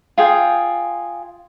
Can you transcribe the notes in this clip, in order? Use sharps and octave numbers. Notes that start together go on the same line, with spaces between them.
F4 G#4 G5